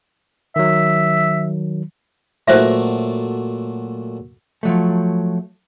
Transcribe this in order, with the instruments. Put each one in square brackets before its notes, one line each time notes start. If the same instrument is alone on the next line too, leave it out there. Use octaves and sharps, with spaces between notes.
[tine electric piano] D#3 F#3 [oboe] E5
[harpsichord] A#2 F#3 A3 [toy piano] B4 C5 E5
[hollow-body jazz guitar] F3 F#3 A3